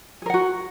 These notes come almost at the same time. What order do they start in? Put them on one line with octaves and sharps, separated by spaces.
G#4 A#4 F#5 F#4